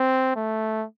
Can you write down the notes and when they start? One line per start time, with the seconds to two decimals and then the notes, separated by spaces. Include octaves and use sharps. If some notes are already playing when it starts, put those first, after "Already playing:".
Already playing: C4
0.36 A3